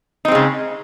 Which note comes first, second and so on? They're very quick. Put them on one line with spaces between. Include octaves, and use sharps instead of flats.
D#4 C4 G#3 C#3